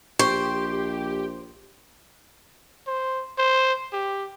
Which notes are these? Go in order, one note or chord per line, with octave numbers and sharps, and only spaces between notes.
A#1 G4 C5 C#6
C5
C5
G4